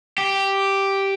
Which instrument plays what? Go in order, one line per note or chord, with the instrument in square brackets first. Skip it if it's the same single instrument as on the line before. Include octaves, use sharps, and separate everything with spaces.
[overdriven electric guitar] G4